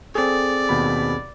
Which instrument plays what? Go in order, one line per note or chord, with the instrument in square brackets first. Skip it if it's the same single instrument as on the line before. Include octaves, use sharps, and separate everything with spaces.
[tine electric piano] C4 G#4 [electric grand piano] A4 [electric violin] D5
[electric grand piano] D#2 B2 B5